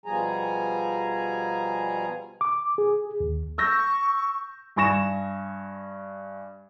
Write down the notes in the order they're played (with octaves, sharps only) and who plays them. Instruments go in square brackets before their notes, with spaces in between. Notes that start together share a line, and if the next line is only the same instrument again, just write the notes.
[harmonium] B2 F3 G3 G#4 G#5 A#5
[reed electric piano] D6
G#4
D#2
[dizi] C#6 [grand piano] E6 G6 A#6
[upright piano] G2 G#5 C#6 A#6 E7